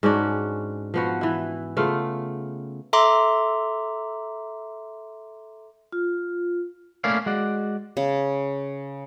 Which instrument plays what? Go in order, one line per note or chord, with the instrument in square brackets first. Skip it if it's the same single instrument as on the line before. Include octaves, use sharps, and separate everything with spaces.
[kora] G#2 C#4 D4 F#4
F3 B3 F#4
E3 E4
C#3 A3 B3 F4
[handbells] A4 E5 A#5 C6 D6
[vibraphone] F4
[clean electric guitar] A3 A#3 C#4 E4 D5 F5
G#3 F#4 D5
[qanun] C#3